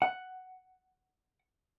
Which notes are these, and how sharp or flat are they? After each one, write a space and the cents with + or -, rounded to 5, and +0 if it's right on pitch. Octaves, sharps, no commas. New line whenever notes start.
F#5 +5